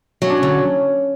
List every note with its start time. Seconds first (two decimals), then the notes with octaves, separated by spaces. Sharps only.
0.22 F#3 C#4
0.30 D4
0.37 C#4
0.43 D3